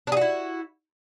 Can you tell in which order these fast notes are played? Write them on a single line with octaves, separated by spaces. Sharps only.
D4 G#4 F#4 E4